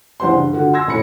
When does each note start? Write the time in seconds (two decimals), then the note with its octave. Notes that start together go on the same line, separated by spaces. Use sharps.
0.20 C#2 E3 G3 C5 F#5 C6
0.33 G2
0.53 D3 F4 F#4
0.73 C6 E6 G#6 A#6
0.87 D#1 A2 B5 C#7